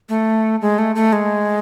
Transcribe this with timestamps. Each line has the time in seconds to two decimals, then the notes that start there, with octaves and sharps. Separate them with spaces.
0.09 A3
0.61 G#3
0.78 A3
0.95 A3
1.13 G#3